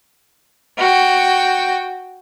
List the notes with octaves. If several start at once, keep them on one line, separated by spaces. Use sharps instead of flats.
F#4 G5